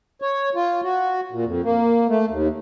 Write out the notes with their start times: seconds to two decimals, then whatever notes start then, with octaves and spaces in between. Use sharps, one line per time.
0.22 C#5
0.55 F4
0.84 F#4
1.32 A#2
1.46 F2
1.64 A#3
2.09 A3
2.30 D#2